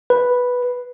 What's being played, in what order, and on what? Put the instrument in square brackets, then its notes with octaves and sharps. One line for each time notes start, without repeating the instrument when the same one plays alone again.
[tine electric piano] B4